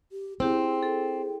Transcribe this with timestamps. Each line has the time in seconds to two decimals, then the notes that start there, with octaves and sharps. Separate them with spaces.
0.12 G4
0.40 C4 E4 G4 G#4
0.83 A4